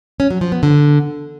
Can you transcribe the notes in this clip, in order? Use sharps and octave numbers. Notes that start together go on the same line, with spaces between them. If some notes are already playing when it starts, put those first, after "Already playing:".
C#4
F#3
F3
B3
D3